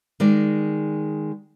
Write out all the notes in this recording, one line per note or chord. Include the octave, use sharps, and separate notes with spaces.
D#3 G#3 D5